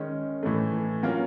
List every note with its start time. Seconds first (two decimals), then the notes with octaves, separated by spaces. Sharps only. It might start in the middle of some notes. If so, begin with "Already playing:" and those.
Already playing: D#3 G#3 C#4
0.43 A2 E3 A3
1.03 F#3 A#3 C#4 F4